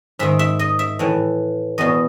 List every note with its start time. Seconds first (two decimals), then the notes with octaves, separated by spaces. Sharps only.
0.19 G#2 D#3 E5
0.39 E5
0.59 D#5
0.79 E5
0.99 A2 E3
1.78 E2 B2 D#5